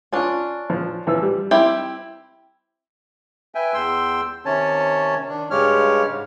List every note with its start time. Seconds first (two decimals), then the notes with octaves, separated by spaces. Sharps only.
0.13 C#4 D4 F4
0.70 F3
1.07 E3 F3 E6
1.22 G3
1.51 C4 E4 G4
3.55 B4 E5 G5 G#5
3.74 E2 G5 C6 E6
4.45 C3 D#3 C#4 C#5 A5
5.29 D#3 D4
5.51 G2 C#3 G#3 G4 C#5 F6
6.10 G#2